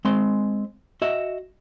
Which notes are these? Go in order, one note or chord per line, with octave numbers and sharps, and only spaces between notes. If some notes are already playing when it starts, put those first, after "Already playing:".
G#3 C4 C6
F#4 D#5 E5